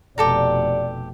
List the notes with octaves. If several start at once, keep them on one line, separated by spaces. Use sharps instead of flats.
F1 B2 G4 A4 D5 A#5